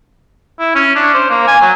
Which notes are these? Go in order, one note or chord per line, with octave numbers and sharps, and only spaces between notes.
E4
C#4
D4
C5
A#3
G#5
F#3